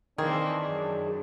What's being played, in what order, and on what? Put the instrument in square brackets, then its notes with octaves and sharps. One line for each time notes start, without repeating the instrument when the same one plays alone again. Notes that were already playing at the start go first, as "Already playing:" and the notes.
[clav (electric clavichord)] D#3 [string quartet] E3 A#3 C4 [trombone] D4 [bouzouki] G#4
[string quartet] F#2